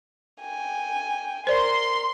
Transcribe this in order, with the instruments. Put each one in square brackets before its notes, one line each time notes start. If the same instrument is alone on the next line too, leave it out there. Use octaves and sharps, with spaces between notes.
[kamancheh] G5 G#5
[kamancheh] A#4 [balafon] C5 D5 [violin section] C6